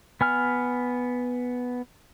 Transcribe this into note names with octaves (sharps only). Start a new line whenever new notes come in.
B3 G#5 F6